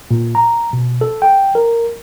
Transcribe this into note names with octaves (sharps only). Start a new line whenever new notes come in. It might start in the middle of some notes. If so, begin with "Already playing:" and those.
A#2
A#5
B2
A4
G5
A#4